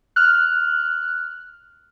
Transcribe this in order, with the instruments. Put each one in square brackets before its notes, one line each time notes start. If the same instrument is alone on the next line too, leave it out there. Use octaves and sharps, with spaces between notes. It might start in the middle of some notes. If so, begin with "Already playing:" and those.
[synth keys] F6 F#6